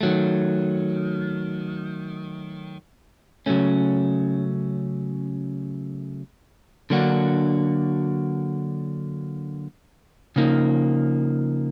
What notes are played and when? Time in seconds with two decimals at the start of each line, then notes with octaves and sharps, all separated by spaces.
0.01 D#3 F#3 A3
3.46 C#3 F#3 A3 C#4
6.90 D3 F#3 A#3 D4 F#4
10.36 C#3 F3 A#3 D#4